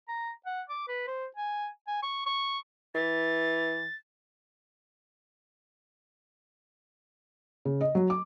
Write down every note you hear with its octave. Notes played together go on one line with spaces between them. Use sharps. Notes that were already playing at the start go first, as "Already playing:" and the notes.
A#5
F#5
D6
B4
C5
G#5
G#5
C#6
C#6
E3 A6
C#3
D#5
F#3
D6